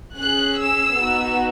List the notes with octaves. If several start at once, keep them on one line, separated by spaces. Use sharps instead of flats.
C#4 G#4 F#6
E6
B3 D#4 F#4